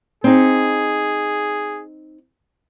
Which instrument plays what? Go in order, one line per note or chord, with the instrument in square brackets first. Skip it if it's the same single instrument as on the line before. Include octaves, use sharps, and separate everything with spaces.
[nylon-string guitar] C4 D#4 [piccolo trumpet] G#4